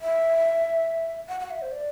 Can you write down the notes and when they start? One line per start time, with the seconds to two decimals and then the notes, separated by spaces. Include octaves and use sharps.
0.01 E5
1.29 F#5
1.40 F#5
1.51 E5
1.62 C5
1.72 D5